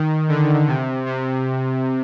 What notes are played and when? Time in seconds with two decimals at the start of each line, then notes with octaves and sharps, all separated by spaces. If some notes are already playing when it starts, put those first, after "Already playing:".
Already playing: D#3
0.29 D3
0.67 C3
1.06 C3